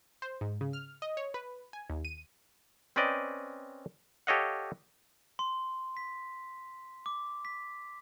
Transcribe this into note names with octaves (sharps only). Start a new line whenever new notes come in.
C5
G#2
C#3
F6
D#5
C#5
B4
G#5
D#2
D#7
C4 C#4 B4 D5 D#5 G5
G4 A4 C#5 D#5 F5 F#5
C6
B6
D6
B6